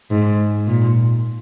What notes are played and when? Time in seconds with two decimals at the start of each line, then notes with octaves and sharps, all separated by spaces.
0.10 G#2
0.67 A#2